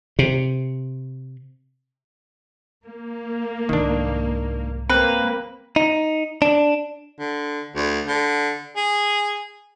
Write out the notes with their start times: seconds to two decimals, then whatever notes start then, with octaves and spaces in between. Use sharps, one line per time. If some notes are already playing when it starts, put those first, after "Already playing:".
0.19 C3
2.86 A#3
3.69 C2 G#2 D#3 D4
4.90 A#3 C4 B4
5.76 D#4
6.42 D4
7.19 D3
7.75 D2
8.07 D3
8.76 G#4